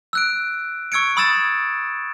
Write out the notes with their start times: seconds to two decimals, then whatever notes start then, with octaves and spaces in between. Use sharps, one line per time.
0.13 E6 F#6 D7
0.92 C#6 E6 G#6 C#7 D7
1.17 B5 D#6 E6 G#6 A6 E7